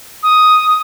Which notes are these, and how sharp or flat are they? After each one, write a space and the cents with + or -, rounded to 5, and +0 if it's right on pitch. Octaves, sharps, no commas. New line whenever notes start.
D#6 +5